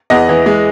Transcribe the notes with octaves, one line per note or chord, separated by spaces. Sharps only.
E2 D#5 F#5
E3
G#3